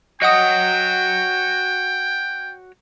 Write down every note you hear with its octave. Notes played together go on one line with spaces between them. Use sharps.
F#4 C#5 D#5 F#5 G5 D#6